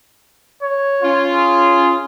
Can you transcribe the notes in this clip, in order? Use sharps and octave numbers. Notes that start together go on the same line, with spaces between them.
C#5
C#4 F4
G#4